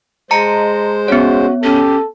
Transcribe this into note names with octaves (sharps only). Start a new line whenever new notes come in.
G#3 C5 D#5 A5 A#5 C#7
B3 C#4 F#4 C#5
C#4 G4 A4